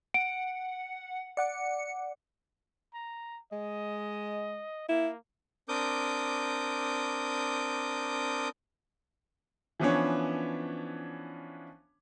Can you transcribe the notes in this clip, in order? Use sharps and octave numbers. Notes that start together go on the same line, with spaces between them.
F#5 D7
D5 F#5 D6 C#7
A#5
G#3 D#5
A#3 E4
C4 D4 A#4 D6 D#6 G6
E3 F3 B3 C#4 D4 C#5